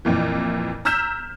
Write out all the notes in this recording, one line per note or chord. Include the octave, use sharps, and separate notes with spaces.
F2 A#2 E3
A#5 E6 F6 G6 B6 E7